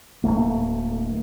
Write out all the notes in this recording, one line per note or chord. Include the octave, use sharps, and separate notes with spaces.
D1 G#2 A3 A#3